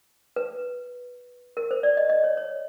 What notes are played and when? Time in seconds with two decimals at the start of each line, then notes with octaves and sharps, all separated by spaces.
0.36 B4
1.57 A#4
1.71 C5
1.83 D5
1.97 D#5
2.10 D#5
2.24 C#5
2.37 C#5